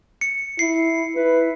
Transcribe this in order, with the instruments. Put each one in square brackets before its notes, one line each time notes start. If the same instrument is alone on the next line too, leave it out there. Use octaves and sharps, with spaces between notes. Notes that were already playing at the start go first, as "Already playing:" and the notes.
[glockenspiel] C#7
[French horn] E4 [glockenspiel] C7
[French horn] E4 [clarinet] B4